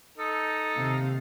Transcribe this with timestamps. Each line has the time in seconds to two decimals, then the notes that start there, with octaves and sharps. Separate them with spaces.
0.18 D#4 A4
0.76 D#2 C3 F5